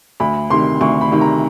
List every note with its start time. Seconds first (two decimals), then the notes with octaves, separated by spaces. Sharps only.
0.20 D2 B5
0.50 C3 D#3 C6
0.81 D2 C#6
1.01 B5
1.11 C3 D#3
1.21 A#5